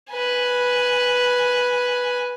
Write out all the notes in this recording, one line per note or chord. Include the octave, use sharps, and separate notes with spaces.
B4 G#5